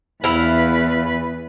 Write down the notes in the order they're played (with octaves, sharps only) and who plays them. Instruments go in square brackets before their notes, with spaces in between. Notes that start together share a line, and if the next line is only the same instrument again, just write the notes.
[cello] E2 B4 [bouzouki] E4 F5